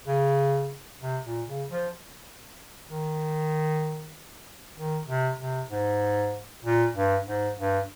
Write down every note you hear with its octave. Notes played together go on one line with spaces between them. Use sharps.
C#3
C3
A#2
C#3
F3
D#3
D#3
C3
C3
G#2
A#2
G2
G#2
G2